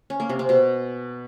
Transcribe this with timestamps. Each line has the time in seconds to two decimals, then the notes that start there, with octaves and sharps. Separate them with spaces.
0.10 C#4
0.20 A#3
0.29 C3
0.39 C4
0.49 B2